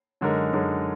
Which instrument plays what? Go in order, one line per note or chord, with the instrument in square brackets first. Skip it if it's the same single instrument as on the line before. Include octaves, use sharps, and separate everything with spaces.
[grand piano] F#2 D3 G#3 D#4 A#4
F#2 D3 G#3 D#4 A#4